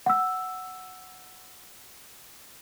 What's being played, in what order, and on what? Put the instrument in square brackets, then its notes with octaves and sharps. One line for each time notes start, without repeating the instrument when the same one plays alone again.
[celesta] F#5 E6